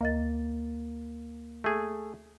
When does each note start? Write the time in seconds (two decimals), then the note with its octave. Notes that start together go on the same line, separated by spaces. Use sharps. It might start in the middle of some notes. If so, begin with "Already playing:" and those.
0.01 D2 A#3 D#5 A6
1.64 A3 G#4